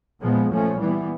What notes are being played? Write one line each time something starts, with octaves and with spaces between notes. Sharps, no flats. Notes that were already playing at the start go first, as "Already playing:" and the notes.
A#2 F3 G#3 B3
A#2 F3 A3 C#4
E3 G3 B3